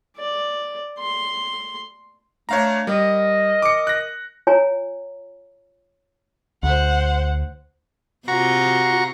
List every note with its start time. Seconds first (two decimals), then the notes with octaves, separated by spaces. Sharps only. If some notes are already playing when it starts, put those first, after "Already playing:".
0.17 D5
0.99 C6
2.49 A3 D4 C#5 F5 A#5
2.87 G3 A#4 D#5
3.62 D6 C#7
3.87 F#6 A#6
4.47 F4 C#5 G#5 A#5
6.63 D2 C5 F#5
8.28 C3 F4 F#4 A#5 C#6